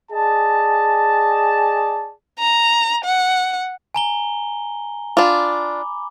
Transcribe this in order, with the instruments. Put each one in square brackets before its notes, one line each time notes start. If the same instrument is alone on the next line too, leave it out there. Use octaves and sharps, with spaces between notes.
[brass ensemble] G#4 D5 D#5 G#5 A5
[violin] A#5
F#5
[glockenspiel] G#5 A#5 G7
[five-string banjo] D4 F4 [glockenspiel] B5 D6